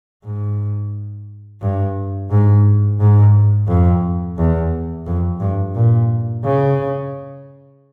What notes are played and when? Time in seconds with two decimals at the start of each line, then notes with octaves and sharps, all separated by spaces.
0.25 G#2
1.61 G2
2.31 G#2
3.00 G#2
3.68 F2
4.38 E2
5.06 F2
5.40 G2
5.75 A#2
6.44 C#3